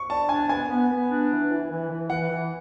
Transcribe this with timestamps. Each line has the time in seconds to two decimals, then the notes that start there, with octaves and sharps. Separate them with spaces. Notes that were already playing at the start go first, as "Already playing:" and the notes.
Already playing: C#6
0.10 D4 A5
0.29 D4 G#5
0.49 B3 G#5
0.69 B3
0.90 B3
1.09 D4
1.29 E3
1.50 E3
1.70 E3
1.89 E3
2.10 E3 F#5
2.30 E3